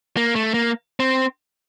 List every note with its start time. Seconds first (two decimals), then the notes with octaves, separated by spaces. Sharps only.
0.17 A#3
0.35 A3
0.54 A#3
1.00 C4